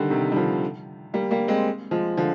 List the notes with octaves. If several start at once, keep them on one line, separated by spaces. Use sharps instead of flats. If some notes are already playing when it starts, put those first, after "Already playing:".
Already playing: D3 D#3 G3
C3 D#3
G3
D3 F3
G3 A#3
G3 A#3
G#3 C4
F3 G#3
D3 F3